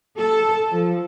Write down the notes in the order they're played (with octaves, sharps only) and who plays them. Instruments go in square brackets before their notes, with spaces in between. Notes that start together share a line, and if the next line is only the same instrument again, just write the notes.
[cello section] A4
F3